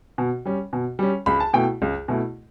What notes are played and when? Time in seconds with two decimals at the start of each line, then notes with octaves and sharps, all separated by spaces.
0.18 B2
0.46 G3 C#4
0.73 B2
0.99 G3 C#4
1.26 C#2 B5
1.40 A5
1.53 B2 A3 E4 G5
1.82 C#2
2.08 B2 A3 E4